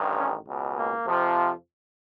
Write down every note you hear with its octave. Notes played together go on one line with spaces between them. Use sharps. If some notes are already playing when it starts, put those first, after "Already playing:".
Already playing: A1 G2 D#3
C#4
C#2 B2
A#3
F2 C3 F3